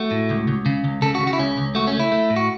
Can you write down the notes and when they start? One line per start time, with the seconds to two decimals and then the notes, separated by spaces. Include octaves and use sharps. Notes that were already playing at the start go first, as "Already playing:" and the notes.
Already playing: A3 F#4
0.11 A2
0.30 C#2
0.48 C#2
0.66 C#3
0.84 C#2
1.02 C#3 A4
1.15 F#4
1.20 C#3
1.27 F#4
1.33 E4
1.39 C#2 C#4
1.57 C#2
1.75 A3 F#4
1.87 C#4
1.93 A3
2.00 E4
2.12 A3
2.30 A2
2.36 F#4